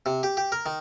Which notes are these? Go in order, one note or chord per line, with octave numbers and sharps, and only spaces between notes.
C3
G4
G4
A#4
D#3